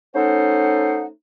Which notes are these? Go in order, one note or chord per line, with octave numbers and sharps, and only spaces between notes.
A3 C#4 D#4 A4 C5 F#5